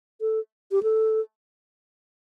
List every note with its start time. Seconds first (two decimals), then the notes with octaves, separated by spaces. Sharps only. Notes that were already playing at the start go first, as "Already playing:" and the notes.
0.21 A4
0.72 G4
0.83 A4